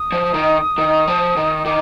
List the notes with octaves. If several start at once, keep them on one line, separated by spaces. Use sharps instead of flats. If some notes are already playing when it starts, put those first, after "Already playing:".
Already playing: D#6
F3
D#3
D#3
F3
D#3
D#3 D6